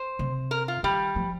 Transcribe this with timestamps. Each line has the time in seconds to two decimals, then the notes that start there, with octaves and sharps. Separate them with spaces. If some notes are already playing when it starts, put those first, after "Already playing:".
Already playing: C5
0.19 C3
0.51 A#4
0.68 F4
0.83 D#3 G3
1.16 F3